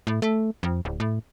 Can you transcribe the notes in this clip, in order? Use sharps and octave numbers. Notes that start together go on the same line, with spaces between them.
A2
A3
F2
D1
A2